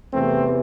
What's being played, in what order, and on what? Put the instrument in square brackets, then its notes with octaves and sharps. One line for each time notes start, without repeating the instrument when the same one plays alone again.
[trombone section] E2 C3 E3 A3 C4